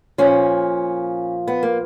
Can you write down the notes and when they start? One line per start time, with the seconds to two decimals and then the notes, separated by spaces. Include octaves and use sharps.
0.18 A#2 F3 C#4
1.48 B3
1.63 A#3